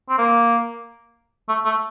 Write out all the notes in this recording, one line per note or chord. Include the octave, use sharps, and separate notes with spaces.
C4
A#3
A3
A3